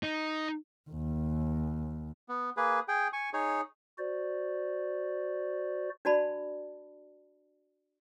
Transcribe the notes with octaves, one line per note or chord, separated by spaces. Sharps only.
D#4
D#2
B3
A#3 G#4 B4
G#4 G5
G#5 C#6
D#4 G#4 C#5
F#4 C5 D5
D4 F#4 D5 A5 B5